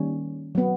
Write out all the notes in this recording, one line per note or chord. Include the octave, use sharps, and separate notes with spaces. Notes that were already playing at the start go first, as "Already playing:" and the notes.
Already playing: D#3 G3 A#3 C#4
F#3 B3